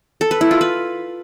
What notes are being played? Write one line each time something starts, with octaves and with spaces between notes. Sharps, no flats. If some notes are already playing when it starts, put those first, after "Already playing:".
A4
B4
E4
F4
B4